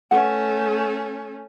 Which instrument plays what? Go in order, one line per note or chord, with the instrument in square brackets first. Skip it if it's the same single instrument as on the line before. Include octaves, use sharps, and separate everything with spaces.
[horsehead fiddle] A3 C#4 [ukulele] B4 F#5